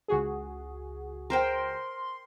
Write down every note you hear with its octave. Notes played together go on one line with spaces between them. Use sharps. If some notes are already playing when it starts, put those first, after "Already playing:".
C#2 F#4 G#4
A#4 C5 G5 C6